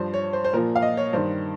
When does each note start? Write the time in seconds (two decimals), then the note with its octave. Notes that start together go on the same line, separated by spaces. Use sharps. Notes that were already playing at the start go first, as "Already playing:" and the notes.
Already playing: G2 F3 C5
0.14 C#5
0.33 C5
0.45 C5
0.53 A#2 F3 A#4
0.76 F5
0.82 D#5
0.97 C#5
1.13 G2 D#3 C5